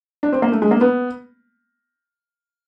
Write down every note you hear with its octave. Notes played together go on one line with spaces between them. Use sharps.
D4
C4
A#3
A3
G#3
A#3
B3